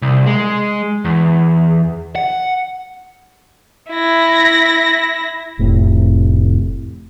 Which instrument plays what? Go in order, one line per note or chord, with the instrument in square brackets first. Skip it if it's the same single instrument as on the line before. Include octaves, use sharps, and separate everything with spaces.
[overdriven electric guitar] C2
G#3
E2
F#5
[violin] E4 A#6
[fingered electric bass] F1 A2 C3